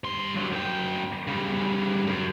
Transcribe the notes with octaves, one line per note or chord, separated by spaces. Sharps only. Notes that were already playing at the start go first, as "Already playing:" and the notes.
G2 C6
G2 F#3
F#2 G5
C#3 G3
F#2